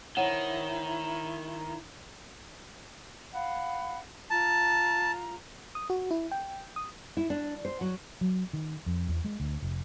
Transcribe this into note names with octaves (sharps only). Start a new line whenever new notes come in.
D#3 E4 C5 C#5 F#5
F5 F#5 B5
F4 A5 A#5
D#6
F#4
E4
G5
D#6
E4
D4
C5
F#3
F#3
D#3
F2
E2
G#3
D2
F1